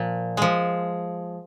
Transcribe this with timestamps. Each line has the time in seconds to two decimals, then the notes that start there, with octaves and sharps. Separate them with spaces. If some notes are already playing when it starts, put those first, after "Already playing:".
Already playing: A#2 F3
0.37 F3 G#3